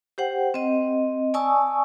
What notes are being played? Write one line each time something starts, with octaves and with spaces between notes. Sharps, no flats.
G4 C5 F#5 G5
C4 D#5
D5 G#5 A5 C#6 D#6 E6